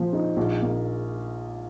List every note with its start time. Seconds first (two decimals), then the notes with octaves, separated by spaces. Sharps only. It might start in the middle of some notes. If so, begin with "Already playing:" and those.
Already playing: A#2 F3
0.13 D#4
0.36 A#1
0.62 A#3